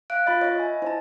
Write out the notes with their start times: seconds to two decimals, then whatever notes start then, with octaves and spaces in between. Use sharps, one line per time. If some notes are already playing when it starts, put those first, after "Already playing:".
0.10 F5 F#6 D7
0.27 F4 D#5 B5 A6
0.41 F4 C#5 D#5
0.55 D#5 E5 G#5
0.82 E4 C5 A5